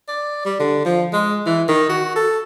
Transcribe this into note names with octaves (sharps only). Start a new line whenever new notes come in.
D5
G3
D3
F3
G#3
E3
D#3
F#4
A4